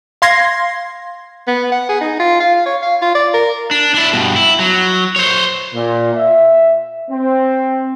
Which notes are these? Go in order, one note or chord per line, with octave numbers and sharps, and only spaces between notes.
F5 C6 G#6 A#6 C7
B3
F#5
G#4
D#4
F4
F5
C#5
F5
F4
D5
A#4
D4
D4 E4
G2 B2
E4
F#3
C5 C#5
A#2
E5
C4